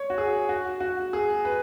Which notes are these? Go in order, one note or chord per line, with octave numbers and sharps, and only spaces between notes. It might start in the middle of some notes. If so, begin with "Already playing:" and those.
Already playing: C#5
F#4
G#4
F#4
F#4
G#4
B4